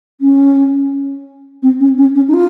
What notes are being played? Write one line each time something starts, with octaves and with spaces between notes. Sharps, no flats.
C#4
C4
C#4
C#4
C#4
D#4
F4